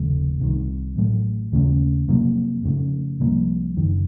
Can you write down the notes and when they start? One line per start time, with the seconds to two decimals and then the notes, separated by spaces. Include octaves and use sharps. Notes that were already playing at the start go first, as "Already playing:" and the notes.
Already playing: F1 D#2 C#3 A3
0.40 C2 C3 D#3
0.96 A1 A2 F#3 A3
1.52 D#2 C#3 A3 C#4
2.08 F2 C3 F#3 A#3
2.64 F2 C#3 A3
3.20 C2 C3 F3 A#3
3.77 F#1 F#2 D#3